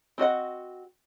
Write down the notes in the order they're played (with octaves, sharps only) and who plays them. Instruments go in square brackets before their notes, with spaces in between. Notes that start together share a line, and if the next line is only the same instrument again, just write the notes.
[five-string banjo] C4 F#4 D#5 F#5